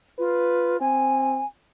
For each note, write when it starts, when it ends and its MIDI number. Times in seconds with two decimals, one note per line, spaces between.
0.19 0.78 65
0.19 0.78 71
0.81 1.41 60
0.81 1.45 80